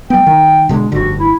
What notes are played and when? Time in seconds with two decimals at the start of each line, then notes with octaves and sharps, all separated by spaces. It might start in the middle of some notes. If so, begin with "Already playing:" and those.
0.10 G3 B3 G5
0.27 D#3
0.69 B2 D3 G#3
0.92 F1 G2 D3 F#4
1.19 E4